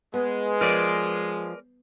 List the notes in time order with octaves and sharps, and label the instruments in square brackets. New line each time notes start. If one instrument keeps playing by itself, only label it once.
[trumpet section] G#3 [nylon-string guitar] B3
[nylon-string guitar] F3 [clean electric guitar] A#4 B4 D5